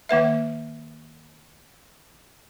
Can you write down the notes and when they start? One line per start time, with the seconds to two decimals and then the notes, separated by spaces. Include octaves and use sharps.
0.09 D#3 A#3 B4 E5